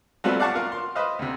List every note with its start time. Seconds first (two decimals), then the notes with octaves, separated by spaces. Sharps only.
0.24 F#3 G3 A3 B3 C4 F4
0.40 D5 F5 F#5 A5 C#6
0.55 F4 A#4 F5
0.72 C6
0.95 B4 C5 D#5 F5
1.19 D2 C3